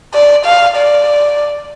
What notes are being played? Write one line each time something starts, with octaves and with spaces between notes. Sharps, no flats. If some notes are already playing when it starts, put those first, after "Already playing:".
D5
F5
D5